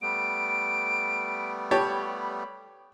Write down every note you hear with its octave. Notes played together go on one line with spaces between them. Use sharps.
G3 A3 B3 D7
G4 C#5 A5 B5